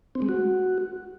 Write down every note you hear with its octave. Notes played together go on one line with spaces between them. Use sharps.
C4
G#3
F#4